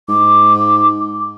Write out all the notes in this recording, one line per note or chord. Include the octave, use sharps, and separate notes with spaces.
G#2 D6